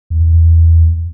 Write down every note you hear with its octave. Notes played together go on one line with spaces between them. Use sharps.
E2